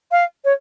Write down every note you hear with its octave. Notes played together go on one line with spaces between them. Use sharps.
F5
C#5